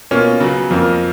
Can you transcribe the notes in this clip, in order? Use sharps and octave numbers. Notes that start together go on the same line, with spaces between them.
B2 A#3 C#4 F4
C#3 F#3 B3
F2 F3 A#3